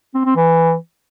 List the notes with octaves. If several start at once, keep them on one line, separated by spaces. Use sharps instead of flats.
C4
C4
E3